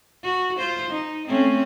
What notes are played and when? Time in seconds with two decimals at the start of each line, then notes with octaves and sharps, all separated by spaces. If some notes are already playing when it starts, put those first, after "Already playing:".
0.23 F#4
0.57 F4 C5
0.90 D#4
1.28 A3 C4 C#4